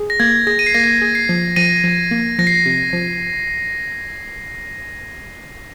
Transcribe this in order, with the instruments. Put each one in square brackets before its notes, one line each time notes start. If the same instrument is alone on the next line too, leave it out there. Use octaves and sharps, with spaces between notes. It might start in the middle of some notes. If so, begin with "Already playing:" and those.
Already playing: [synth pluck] G#4
[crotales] A#6
[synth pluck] A#3 [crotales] G#6
[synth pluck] G#4 [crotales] A#6
[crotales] D#7
C7
[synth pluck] A#3 [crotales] A#6
[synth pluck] G#4
[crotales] C7
[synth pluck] F3
[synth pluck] F3 [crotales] A#6 D#7
[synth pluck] F3
A#3
[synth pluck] F3 [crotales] A#6
[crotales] C7
A#6
[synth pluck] C3
F3